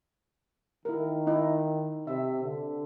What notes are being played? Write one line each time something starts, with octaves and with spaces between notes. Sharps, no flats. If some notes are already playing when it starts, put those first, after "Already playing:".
D#3 E4 A#4
D#4 E4 D#5
C3 E5
D3